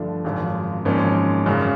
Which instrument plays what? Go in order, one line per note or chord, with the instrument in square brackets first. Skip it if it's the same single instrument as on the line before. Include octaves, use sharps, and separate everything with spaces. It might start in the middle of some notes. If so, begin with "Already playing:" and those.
Already playing: [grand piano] G2 D3 F3 A3 D4
G#1 F#2 C#3 F3
G#1 G#2 F3 A#3 C#4
G#1 F#2 C#3